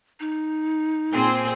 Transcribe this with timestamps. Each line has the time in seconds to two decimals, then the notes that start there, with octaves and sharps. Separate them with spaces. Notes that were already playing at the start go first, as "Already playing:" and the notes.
0.20 D#4
1.13 A#2 C4 G#4